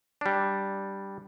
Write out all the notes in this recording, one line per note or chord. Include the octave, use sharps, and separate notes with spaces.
G3 D4